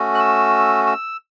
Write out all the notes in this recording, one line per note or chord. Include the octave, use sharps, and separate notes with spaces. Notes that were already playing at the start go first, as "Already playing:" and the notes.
Already playing: A3 C#4 F#4
F#6
E6
E6